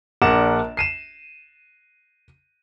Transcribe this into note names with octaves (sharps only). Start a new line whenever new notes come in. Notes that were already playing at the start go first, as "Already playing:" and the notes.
A#1 D4 A#4 F#5 D6 E7
C7 D#7 E7